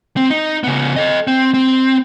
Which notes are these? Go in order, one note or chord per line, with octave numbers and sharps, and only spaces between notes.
C4
D#4
C#3 B3
A4 D#5
C4
C4